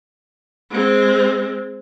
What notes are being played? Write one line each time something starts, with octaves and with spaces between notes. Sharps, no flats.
G#3 C4